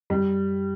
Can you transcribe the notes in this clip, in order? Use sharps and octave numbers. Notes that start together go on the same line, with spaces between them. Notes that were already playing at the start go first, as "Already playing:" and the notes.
F#2 G3